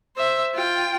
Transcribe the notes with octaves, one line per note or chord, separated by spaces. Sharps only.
C5 E5
F4 G5